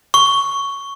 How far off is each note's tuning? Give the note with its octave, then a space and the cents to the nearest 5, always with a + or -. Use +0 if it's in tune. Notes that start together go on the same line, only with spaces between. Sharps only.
C#6 +5